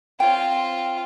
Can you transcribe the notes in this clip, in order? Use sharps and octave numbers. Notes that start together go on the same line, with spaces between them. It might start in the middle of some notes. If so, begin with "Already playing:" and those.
C4 F4 C#5 G5